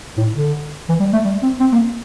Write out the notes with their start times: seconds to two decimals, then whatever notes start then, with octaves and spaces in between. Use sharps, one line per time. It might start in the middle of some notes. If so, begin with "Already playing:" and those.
0.17 A2
0.36 D3
0.89 E3
1.00 G3
1.13 A3
1.25 G3
1.43 C4
1.60 C4
1.72 A#3